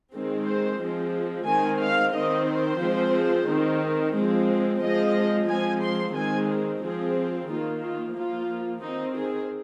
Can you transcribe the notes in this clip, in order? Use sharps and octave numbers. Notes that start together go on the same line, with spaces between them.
D#3 G#3 C4
C5
F3 G#3 C4
D#3 G#3 C4 G#5
F5
D#3 C4 D#5
C5
F3 G#3 C4
D#3 C4
F3 G#3 C4
F3 G#3 C4 D#5
F3 G#3 C4 G#5
C6
D#3 G#3 C4 G#5
G#4
F3 C4 G#4
D#3 A#3 F4
F4
F3 A#3 F4
D#3 C4 D#4
G#4